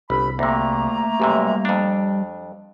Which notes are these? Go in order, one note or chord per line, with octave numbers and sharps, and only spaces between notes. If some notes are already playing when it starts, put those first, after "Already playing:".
G1 C2 B5
D2 C3 A3 A#3 A#5
B1 F#2 C3 G3
F2 D4